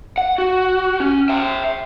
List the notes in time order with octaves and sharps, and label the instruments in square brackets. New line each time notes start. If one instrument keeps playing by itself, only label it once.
[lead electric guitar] F#5
F#4
C#4
E5 G5